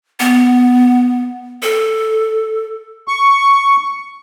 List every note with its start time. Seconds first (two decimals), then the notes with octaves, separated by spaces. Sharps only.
0.20 B3
1.62 A4
3.08 C#6